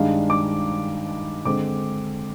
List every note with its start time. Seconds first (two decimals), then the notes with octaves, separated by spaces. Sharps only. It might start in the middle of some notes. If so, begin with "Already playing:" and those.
Already playing: G2 D#3 G#3 D4 F5
0.30 D6
1.45 D3 G#3 C4 D6